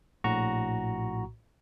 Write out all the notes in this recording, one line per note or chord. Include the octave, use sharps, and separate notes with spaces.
A#1 A2 F#4 A#5 C#6